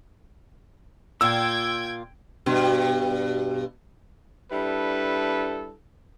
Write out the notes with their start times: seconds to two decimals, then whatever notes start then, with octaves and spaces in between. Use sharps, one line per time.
1.21 A#2 F4 G5 E6 G#6
2.46 G2 B2
4.51 G3 D4 E4 A4 B4